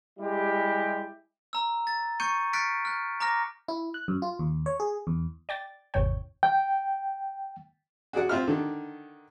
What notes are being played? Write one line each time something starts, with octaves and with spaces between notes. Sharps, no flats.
G3 G#3 E4 G4
A#5 E6
A6
C#6 G6 G#6 C#7 D#7
F6 F#6 A6 B6 C#7 D7
F6 F#6
A#5 D6 F6 A#6
E4
F#6
F#2
F4
D#2
C#5
G#4
E2
D5 G5 A6
G#1 E2 C3 C#5 G5
G5
F#4 G#4 D5 F#5
C4 F4 E5 F6
D3 D#3